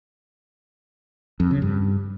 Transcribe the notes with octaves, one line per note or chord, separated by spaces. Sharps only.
F2
C#3
G2